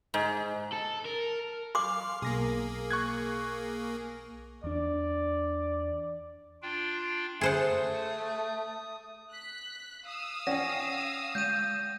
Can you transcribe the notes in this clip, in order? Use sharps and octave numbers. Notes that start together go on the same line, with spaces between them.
G#2
A4
A#4
F5 C6 D6
B1 A#3 G#4 A#6
C#6 F#6 G#6
E2 D4 D5
D4 F4 G5
A3 G#4 C5 F#5 D#6
F#6 B6
F5 D#6 E6
C#4 F#5 G5 A#6
G#3 G6 D#7